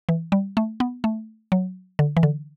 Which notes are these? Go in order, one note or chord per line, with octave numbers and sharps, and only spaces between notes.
E3
G3
A3
B3
A3
F#3
D3
E3
D3